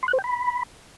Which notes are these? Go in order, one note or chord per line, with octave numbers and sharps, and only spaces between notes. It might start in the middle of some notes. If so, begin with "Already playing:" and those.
C6
F#6
C5
G5
B5